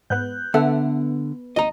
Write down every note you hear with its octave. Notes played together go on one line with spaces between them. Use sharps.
G#2 B3 F#6 G6
D3 B3 A4 E5 F#5
G#1 D#2 D#5 A#5